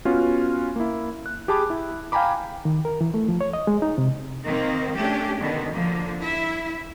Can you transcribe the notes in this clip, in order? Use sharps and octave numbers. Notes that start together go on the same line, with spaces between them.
B3 C#4 F4 F#4
A#3 E4
F#6
G4 G#4 A5 B5 D6
E4
F5 G5 G#5 A#5 B5 D6
D#3
A#4
E3
A3
F3
C#5
D#5
G#3
D#4
C3
D#3 A#3 C4
A3 C#4 D4 G4
B2 D3 D#3 B3
D3 F3 A#3
E4 E5